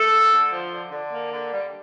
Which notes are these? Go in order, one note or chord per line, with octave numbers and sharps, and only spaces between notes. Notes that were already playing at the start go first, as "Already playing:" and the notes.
Already playing: A3 A4
D3
D3
F3
D3
D3
A#3
D3
G3